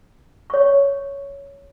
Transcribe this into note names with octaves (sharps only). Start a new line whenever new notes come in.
C#5 C#6